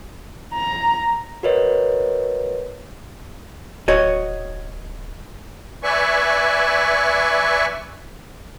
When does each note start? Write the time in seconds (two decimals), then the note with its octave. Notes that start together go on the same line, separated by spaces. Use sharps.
0.54 A#5
1.43 F#4 A#4 B4 C#5 D#5
3.88 D1 F#4 C#5 D#5
5.83 B4 D5 E5 G#5 C#6